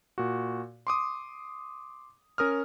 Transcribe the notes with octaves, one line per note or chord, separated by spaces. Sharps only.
A#2 F#4
C6 D6 D#6
C#4 A#4 D#6 F6